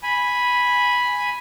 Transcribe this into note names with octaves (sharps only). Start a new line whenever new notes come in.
G#5 B5